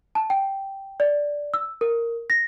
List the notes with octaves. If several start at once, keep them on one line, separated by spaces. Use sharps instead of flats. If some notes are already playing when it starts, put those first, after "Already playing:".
A5
G5
D5
E6
A#4
A#6